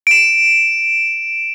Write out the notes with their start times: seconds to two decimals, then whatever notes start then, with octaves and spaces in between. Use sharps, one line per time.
0.07 D7 E7